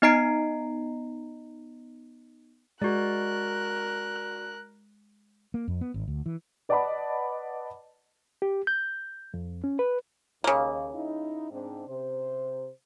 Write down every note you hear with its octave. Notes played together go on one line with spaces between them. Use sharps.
B3 D#4 D#5 A#5 C7 D7
G#3 F#4 A#4 D5 F#6
A#3
F2
B3
G#1
D2
E3
B4 D5 D#5 F#5 A5 B5
G4
G6
F2
C#4
B4
D#2 C#3 A#3
D#4 E4
G#2 C4 D4
C3 C5